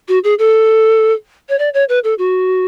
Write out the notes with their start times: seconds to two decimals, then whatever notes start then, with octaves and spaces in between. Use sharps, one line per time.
0.08 F#4
0.24 G#4
0.39 A4
1.49 C#5
1.59 D5
1.74 C#5
1.89 B4
2.04 A4
2.18 F#4